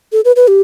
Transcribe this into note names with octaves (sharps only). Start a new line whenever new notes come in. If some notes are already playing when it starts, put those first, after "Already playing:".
A4
B4
B4
G4